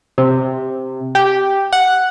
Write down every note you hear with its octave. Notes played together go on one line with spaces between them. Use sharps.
C3
G4
F#5